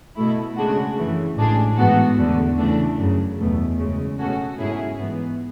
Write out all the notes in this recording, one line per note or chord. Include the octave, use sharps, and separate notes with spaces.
B2 A3 E4
C#3 G#3 D4 F#4
F#2 C#3 E3 A3
A1 A2 G#3 D4 G#4
G#2 E3 B3 F#4 A4
E2 D3 A3
C#3 E3 A3 D4
F#2 C#3 F#3
E2 B2 A3
F#2 C#3 G#3
B2 A3 C#4 F#4 A4
G#2 F#3 C#4 E4 G#4
G#2 E3 B3